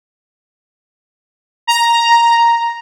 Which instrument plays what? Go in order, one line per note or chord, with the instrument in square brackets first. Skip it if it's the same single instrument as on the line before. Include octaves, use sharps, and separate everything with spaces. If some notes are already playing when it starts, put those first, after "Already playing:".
[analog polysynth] A#5